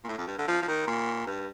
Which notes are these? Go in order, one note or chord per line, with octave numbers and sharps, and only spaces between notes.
A#2
A2
F2
G2
D3
F3
F3
D#3
A#2
G2